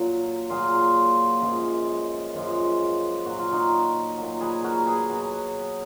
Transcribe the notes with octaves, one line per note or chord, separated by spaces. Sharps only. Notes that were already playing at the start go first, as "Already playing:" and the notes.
Already playing: A#2 F#3
A#2 F#3 F4 G#4
F#2 F3 G#3
F#2 F3 G#3
A#2 F#3 F#4
F4
D#4 F#4
A#2 F#3
G#4 B4
F#4 A#4
G#4 B4
B2 F#3